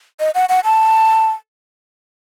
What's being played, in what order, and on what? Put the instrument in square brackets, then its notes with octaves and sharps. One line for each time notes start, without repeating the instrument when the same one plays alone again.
[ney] D#5
F#5
F#5
A5